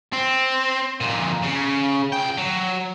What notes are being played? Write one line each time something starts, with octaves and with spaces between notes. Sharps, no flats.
C4
F2 A#2
C#3
C#2 G5
F#3